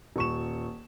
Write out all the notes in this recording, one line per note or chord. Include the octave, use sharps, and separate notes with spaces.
D#1 C#6 E7